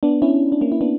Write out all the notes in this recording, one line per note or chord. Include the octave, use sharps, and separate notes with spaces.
B3 D4
C#4 E4
D4
A#3 C#4
E4
B3 D4